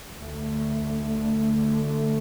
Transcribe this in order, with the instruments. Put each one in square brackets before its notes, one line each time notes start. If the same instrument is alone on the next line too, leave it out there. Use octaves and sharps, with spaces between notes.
[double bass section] D2 D3 A3